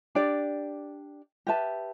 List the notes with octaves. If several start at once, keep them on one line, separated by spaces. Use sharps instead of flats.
D4 G4 D5
G4 B4 E5 A5